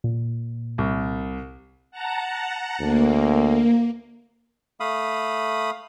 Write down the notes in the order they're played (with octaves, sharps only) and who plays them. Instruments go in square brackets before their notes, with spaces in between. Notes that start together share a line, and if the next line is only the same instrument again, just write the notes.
[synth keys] A#2
[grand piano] C2
[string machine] F#5 A5 A#5
[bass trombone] D2 [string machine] A#3
[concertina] A3 F5 B5 D#6